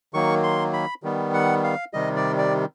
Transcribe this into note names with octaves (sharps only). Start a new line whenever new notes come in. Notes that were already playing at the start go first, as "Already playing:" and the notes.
D#3 F#3 A#3 C#6
C6
B5
D#3 G3 B3
F#5
F5
C3 D#3 G3 D#5
D5
D5